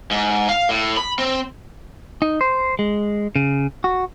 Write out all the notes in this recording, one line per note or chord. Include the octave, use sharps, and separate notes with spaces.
G#2
F5
A2
B5
C4
D#4
C5
G#3
C#3
F#4